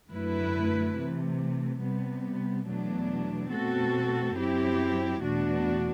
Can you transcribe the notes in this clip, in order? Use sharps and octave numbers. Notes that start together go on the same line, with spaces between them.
F#2 D3 A3 E4 B4
C3 E3 A3
C3 G3 B3
E2 B2 F#3 A3 D4
B2 A3 C4 F#4 A4
F#2 F#3 C4 E4 G4
E2 B2 A3 D4 F#4